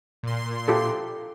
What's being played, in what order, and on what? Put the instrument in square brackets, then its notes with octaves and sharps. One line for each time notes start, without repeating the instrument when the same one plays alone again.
[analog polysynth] A#2 C6
[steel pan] F4 G4 A4